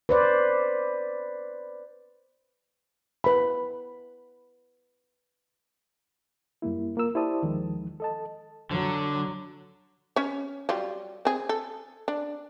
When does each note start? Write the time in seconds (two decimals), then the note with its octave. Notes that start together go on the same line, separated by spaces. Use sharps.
0.09 B4 C5 D5
3.24 B4 B5
6.62 F#2 G3 A#3 E4
6.97 A#3 F4 A#4 E6
7.15 E4 G4 C5 D5 A5 D#6
7.42 D#2 D#3 F3 G#3
8.00 A4 D#5 A5
8.71 D3 F#3
10.16 C#4 C#5
10.69 F#3 G3 F4
11.25 C4 G#4
11.49 A4
12.08 D4